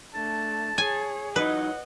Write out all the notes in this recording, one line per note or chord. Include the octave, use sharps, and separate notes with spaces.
A3 D4 A5
G#4 C#5 G#5
E3 F#3 D#4 B4 D#5 F#5